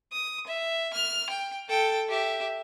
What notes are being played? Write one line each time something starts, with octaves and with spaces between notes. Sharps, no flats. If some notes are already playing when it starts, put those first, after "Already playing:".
D#6
E5
F6
G5
A4 G5
G4 E5